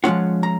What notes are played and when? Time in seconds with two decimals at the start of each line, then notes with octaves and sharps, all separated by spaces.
0.04 F3 G#3 C#4 F4 F#5
0.43 A#5